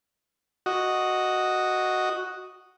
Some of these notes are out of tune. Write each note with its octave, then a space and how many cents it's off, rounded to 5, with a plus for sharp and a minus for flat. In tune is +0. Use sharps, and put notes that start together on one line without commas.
F#4 +0 D#5 +0